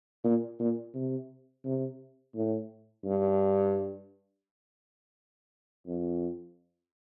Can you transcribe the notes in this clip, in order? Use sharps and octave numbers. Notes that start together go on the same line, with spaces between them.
A#2
A#2
C3
C3
A2
G2
F2